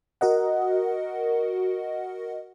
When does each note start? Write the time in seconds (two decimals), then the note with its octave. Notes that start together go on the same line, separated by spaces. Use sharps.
0.21 F#4 A#4 D#5 F#5